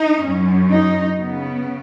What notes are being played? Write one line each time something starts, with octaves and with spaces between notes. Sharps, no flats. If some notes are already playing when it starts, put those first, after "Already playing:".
Already playing: D#4
F#2 F#3 C#4
D#4
C#3 B3